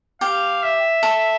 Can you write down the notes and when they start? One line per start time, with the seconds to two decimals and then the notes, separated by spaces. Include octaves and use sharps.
0.21 G4 F5
0.63 E5
1.03 A4